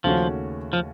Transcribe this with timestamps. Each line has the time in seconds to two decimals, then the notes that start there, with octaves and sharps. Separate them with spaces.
0.04 D#2 C#3 F3 A3 C#4 F#4
0.73 F3